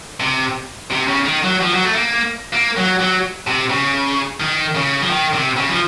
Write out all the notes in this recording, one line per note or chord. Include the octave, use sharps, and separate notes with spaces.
C3
C3
C#3
D#3
F#3
F3
F#3
A3
A#3
A#3
F#3
F#3
C3
C#3
D#3
C#3
F3
D#3
C3
C#3
F3